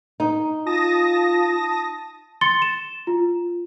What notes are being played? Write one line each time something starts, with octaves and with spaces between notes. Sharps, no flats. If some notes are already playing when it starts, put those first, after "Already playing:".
D#4
F4 A5 D#6 A#6
C6 A6 C#7 G7
E7
F4